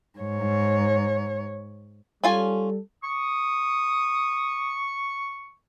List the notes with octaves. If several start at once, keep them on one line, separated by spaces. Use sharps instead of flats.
G#2 C#5
G3 C#4 F4 A4 G#5
C#6 D#6